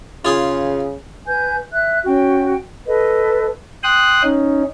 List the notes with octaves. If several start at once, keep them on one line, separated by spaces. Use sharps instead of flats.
C#3 F4 G#4 C6
B4 G#5 G6
E5 F#6
C#4 F#4 G5
A4 B4 D#5
G5 C6 D#6 F#6
C#4 D#4